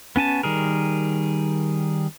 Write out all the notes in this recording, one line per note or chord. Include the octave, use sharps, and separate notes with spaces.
B3 C#4 G#5 A5
D#3 G3 G#4 A#4